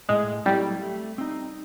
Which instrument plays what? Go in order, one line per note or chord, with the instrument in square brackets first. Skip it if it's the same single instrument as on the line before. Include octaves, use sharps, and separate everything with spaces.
[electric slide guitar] A2 [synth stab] G#3
[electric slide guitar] F#3 A3 C4 E4 [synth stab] G3
[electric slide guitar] A3
C4 D#4